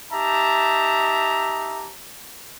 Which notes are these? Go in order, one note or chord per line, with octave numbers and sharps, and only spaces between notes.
D#4 G4 E5 A5 A#5